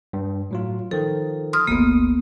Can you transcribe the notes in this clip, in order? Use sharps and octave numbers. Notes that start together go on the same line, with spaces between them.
G2
A2 F#3 F4
D#3 F3 A4
C6 D#6 F6
G1 D2 A#3 B3 D#6